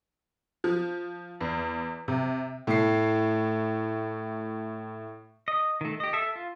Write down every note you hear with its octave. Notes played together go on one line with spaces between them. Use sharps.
F3
E2
C3
A2 C7
D#5
D#3 A3
G4 D#5
A4 E5
F4